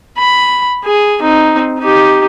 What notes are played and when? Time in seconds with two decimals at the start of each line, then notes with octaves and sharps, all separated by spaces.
0.18 B5
0.84 G#4
1.22 C4 D#4
1.79 D#4 G4